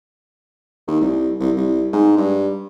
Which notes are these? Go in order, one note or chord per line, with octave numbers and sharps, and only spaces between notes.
D#2
C2
C2
C2
G#2
G2